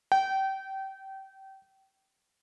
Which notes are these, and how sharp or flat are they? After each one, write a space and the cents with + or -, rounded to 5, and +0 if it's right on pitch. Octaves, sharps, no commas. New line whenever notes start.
G5 -25